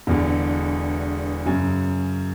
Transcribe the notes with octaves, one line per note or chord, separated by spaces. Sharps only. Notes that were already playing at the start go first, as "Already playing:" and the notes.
E1 E2 D3
F#2 C#3 F#3